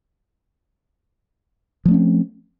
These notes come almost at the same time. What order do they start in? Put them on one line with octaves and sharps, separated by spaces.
F3 A3 C#4 C4